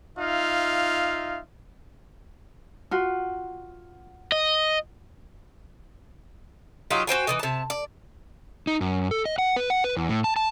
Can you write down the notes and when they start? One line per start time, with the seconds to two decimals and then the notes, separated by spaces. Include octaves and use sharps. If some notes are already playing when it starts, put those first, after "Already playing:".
0.17 D#4 F4 E5 F5
2.91 F4 F#4
4.32 D#5
6.91 F#3 D#4 F4 G4
7.07 F#4 C5 G5 G#5
7.27 E3 F3 D#4
7.39 C3 A5
7.70 D5
8.67 D#4
8.81 F#2
9.11 A4
9.25 D#5
9.38 F#5
9.56 B4
9.70 F#5
9.84 B4
9.97 E2
10.09 A2
10.24 A5
10.36 A5